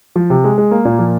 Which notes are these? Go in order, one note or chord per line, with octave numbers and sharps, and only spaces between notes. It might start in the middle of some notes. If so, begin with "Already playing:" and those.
F3
C3
G#3
G#3
A#3
A#2
F3